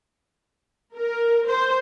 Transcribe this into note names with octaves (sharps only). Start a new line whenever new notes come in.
A#4
C5